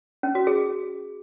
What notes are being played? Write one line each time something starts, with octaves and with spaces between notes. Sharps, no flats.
C#4
F#4
G#4